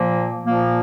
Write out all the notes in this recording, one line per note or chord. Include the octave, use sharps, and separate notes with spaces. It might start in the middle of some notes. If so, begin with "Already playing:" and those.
Already playing: A#2 F3 A#3
A#2 F3 A#3